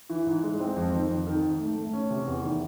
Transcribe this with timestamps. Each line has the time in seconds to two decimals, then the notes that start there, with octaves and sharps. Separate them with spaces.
0.10 E3
0.26 G#2
0.44 G#3
0.60 C4
0.76 F2
0.93 D#3
1.10 F2
1.27 D#3
1.43 G#2
1.60 A3
1.76 A3
1.93 C#4
2.10 C3
2.27 E2
2.43 D#3